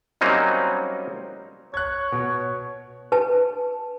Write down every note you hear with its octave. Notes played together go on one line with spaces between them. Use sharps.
F#3 G3 A#3 C4 C#4 D#4
C#5 F#6 G#6
B2
B4 A5